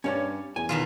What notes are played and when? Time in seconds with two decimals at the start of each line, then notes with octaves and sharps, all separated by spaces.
0.04 G2 C#4 C#5 D5
0.56 E2 G#5
0.69 B2 D#3 F4